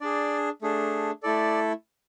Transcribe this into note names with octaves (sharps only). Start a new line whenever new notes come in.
D4 G#4 D5
A3 D4 G#4
A3 E4 A4 D5